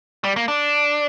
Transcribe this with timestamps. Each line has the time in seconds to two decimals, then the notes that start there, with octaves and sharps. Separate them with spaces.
0.24 G3
0.36 A#3
0.48 D4